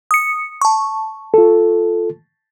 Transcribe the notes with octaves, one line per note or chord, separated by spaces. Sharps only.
D#6 C#7
A5 C#6
F4 A4